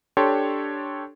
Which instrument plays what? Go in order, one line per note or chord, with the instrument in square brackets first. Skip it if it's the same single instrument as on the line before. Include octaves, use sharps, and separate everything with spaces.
[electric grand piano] D4 G4 A4 C#5 C6